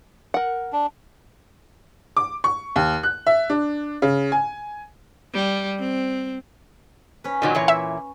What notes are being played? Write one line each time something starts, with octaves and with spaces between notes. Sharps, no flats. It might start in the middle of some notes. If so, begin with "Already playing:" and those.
A#4 F#5
D4
D6
C#6
D#2
F#6
E5
D4
C#3
G#5
G3
C4
C#4 B4
A#2 D#3 F#3
A#2 E3 C#5
E5